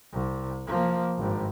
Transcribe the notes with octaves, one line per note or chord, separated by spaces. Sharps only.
C2
F3 A#3
G#1 G2